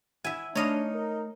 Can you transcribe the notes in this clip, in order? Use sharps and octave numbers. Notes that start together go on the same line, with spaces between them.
E4 E5 F#5 G#5
A3 D4 D#4 C#5 D#5 F5 A#5 B5
A#4